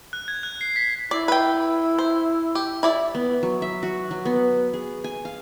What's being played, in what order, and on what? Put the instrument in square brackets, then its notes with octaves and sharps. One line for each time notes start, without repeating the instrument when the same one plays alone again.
[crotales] F#6
G#6
F#6
C7
B6
[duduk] E4 [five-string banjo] D5
[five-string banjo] B4 G5
C5
G4
E4 D5 E5
[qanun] B3
F#3
E5
F#4
F#3
B3
G#4
G#5
F5